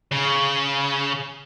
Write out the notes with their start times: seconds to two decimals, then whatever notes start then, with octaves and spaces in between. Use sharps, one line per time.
0.11 C#3